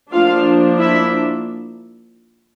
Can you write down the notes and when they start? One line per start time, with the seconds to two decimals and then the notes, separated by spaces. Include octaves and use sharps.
0.12 F3 A#3 D4 F4 F5
0.79 E4 E5